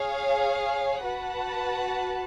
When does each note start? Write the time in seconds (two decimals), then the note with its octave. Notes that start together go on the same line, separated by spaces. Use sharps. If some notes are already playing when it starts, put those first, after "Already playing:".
Already playing: G#4 C#5 F5
1.04 F#4 B4 F#5 A5